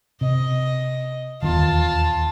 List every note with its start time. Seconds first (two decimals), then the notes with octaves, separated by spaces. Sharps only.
0.21 C3 D#5
1.42 D#1 E2 D#3 F4 A5